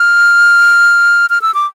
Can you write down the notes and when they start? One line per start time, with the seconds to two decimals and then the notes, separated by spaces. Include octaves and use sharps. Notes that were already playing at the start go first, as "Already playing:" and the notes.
Already playing: F6
1.30 F6
1.42 E6
1.54 D6